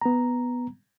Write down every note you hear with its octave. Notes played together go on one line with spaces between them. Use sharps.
B3 A#5